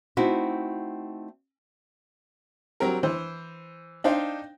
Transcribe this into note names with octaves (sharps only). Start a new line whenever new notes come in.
A3 C4 D#4 E4 F#4
F#3 G3 C4 A#4
E3 C5
D4 D#4 C5 F5 G5